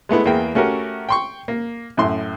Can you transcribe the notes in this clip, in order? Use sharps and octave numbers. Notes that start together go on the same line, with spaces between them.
G#3 A3 B3 E4
E2 A#3 B3 G#4 G5
A3 C#4 F#4 G4 A#4
G5 C6 C#6
A#3
F#2 A2 C6